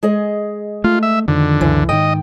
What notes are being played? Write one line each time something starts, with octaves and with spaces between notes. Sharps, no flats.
G#3 G#4 D#5
A3 F4
E5
F2 D3 D#3 F3
C#2 F#2 E3
G#2 D#3 D#5 G5